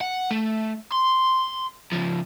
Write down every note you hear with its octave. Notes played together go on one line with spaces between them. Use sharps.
F#5
A3
C6
C#3 F3